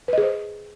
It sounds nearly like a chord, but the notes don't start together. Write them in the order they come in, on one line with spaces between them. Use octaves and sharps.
B4 D#5 G#4 C5